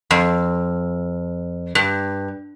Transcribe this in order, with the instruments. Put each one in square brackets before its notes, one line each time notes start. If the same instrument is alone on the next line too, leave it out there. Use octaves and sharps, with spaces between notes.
[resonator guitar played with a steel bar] F2
G2